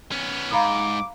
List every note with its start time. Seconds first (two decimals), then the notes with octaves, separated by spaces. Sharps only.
0.12 B3 C#4
0.52 G#2 F5 A#5 B5 D6